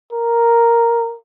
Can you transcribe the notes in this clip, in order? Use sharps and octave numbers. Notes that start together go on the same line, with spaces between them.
A#4